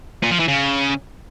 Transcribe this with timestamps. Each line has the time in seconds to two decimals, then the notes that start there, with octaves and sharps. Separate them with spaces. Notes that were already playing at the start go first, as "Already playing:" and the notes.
0.23 A#2
0.31 F3
0.39 E3
0.48 C#3